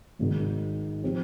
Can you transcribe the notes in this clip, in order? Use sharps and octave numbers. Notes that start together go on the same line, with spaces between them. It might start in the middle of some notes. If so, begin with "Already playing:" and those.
G#1 G#2 D#3
F3 C4 G4